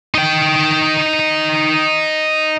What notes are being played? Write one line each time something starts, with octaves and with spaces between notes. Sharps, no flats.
D#4 G5